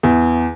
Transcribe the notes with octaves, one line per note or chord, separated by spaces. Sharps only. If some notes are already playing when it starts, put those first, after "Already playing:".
E2